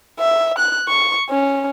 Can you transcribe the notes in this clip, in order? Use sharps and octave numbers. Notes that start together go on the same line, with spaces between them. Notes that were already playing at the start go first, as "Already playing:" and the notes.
E5
F#6
C#6
C#4